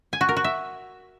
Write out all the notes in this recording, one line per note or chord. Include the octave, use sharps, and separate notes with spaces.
G#5
F#4
A#4
F#4
E5